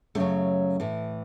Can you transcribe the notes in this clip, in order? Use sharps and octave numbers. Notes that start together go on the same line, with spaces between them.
F#2 C#3 F#3 A3
A2 E3